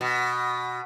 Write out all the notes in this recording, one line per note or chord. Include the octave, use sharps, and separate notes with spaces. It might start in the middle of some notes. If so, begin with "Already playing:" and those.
B2